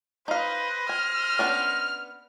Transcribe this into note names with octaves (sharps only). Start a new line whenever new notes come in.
D#4 B4 C5 D#5 F5
G#5 F6
B3 C#4 D4